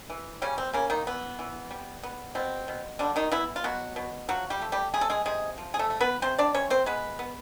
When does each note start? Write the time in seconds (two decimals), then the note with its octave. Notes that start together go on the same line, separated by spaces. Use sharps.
0.10 E3
0.42 C#3 G3 C#4
0.58 C4
0.73 C#3 A#3 C#4
0.90 D#3 D#4
1.07 E3 B3
1.39 E3
1.71 G3
2.03 B3
2.35 B2 C4
2.68 B2
2.99 D3 G3 D4
3.16 D#3 D#4
3.32 E3 B3 E4
3.56 F4
3.64 B2 F#3 F#4
3.96 B2
4.29 F3 F#3 F#4
4.50 G3 G4
4.62 A3
4.72 G3 G4
4.94 C3 G#4
5.01 A4
5.10 G#3 G#4
5.26 C3 G#3 G#4
5.58 F3
5.74 G#4
5.79 A3 A4
5.90 A3
6.00 B3 B4
6.22 C3 C4 C5
6.38 D4 D5
6.54 C3 C#4 C#5
6.70 C4 C5
6.86 G#3 B3 B4
7.19 B3